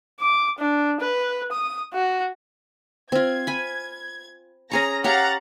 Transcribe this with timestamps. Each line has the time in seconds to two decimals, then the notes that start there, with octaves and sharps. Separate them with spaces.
0.20 D6
0.58 D4
1.01 B4
1.52 D#6
1.93 F#4
3.12 C4 F4 G#6
3.47 G#5 B5
4.71 C#4 G#4 A#5 C#6 A#6
5.04 G4 C#5 F5 F#5 A#5 A6